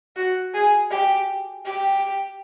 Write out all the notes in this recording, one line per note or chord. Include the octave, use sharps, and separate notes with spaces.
F#4
G#4
G4
G4